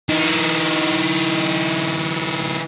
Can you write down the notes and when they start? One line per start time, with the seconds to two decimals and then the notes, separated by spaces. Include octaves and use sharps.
0.09 E3 D#4